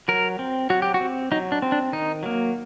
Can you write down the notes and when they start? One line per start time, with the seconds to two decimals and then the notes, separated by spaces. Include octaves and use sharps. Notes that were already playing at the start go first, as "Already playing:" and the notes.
0.08 F#3 A#4
0.39 C4
0.70 F#3 F#4
0.82 G4
0.94 F#4
1.01 C4
1.32 F#3 D#4
1.52 D4
1.62 C4
1.72 D4
1.93 D#3 D#4
2.23 F#3 A#3